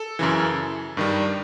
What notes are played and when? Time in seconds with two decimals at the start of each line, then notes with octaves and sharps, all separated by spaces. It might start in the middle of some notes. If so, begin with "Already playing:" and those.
Already playing: A4
0.19 F#2 C#3 E3
0.97 G2 D#3 G3